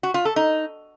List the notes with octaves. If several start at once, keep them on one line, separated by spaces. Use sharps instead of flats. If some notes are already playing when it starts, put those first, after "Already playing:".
F#4
F4
A4
D#4